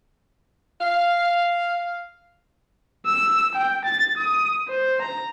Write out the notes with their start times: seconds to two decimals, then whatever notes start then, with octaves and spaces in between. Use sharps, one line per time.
0.80 F5
3.06 E6
3.55 G5
3.85 A6
4.17 D#6
4.68 C5
5.02 A#5